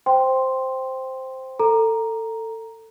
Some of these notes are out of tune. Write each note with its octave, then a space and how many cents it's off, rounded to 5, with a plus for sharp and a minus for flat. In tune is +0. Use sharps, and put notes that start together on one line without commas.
C5 +0 G5 +0 C6 +0
A4 +20 A#5 +0